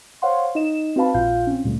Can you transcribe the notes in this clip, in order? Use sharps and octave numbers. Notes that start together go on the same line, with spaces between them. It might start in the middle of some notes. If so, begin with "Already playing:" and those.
C5 C#5 F5 F#5 C6
D#4 D#5 E7
C4 F#4 B4 F5 A5 B5
A#1 A#2 F4 F5 G6
C4 C#4
D2 A#2 G3 A3